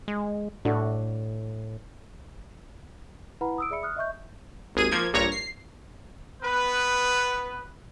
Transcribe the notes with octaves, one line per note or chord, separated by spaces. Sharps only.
G#3
A2 D4 F#4 A4
E4 B4 F#5 A#5 B5
D#6 E6 D7
G#4 D5 E5 B5 C#7
D#6 F6 F#6
D#5 E5 C#6 G6
G#1 D#2 G#4 D#7
F3 A#3 G#6
A#1 G2 A#2 C#5 A#5 A#6
C7
B3 B4